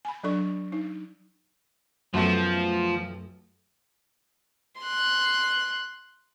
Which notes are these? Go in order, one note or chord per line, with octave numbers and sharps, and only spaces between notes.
G#5 B5
F#3 D4 A4 D5 C#6
D#4
B1 F#2 B2 F3 A3
C6 F#6